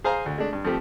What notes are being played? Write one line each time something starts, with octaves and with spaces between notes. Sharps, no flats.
G#4 C5 F5 G#5 A#5
D2
G#3 A3 D4
G2
F3 A3 C4 G4